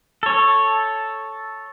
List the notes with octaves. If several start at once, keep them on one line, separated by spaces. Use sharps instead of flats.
A4 C#5